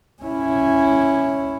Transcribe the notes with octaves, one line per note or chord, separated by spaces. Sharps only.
C#4 E4